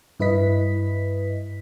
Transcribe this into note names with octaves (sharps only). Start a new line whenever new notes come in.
G2 E4 B4 D#5 B6